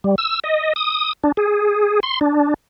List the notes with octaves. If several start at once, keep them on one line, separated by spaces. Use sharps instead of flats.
G3
E6
D#5
D#6
D4
G#4
C6
D4